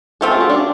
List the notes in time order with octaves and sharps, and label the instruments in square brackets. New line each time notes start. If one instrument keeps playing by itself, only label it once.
[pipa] A3 C4 F4 [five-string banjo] A4
[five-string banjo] G#4
F#4
D4